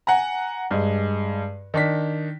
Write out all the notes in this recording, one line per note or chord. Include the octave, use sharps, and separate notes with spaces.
F#5 G#5 A#5
G2 G#3
D#3 D4 B6